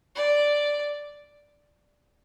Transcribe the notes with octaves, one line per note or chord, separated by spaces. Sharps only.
D5